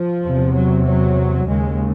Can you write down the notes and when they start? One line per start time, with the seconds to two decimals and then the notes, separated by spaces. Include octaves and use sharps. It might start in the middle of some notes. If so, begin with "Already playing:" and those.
Already playing: F3
0.24 E2 C3
0.54 F#3
0.86 F#3
1.48 D#2 C#3 G#3